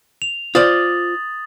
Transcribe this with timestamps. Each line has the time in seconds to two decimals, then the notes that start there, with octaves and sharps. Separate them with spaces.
0.22 F7
0.55 F4 C5 D5 D#6 A6 F#7